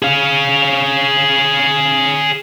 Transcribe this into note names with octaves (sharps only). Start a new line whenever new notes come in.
G#4 F5